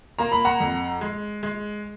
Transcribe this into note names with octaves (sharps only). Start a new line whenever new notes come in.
A#3 A#5
B5
F#5 A#5
F2
G#3
G#3